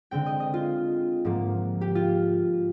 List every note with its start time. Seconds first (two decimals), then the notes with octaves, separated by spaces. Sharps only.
0.11 D3 G#3 C4 G5
0.26 D#5
0.40 D#5
0.54 F4
1.25 G#2 F3 A#3
1.81 G4
1.95 F4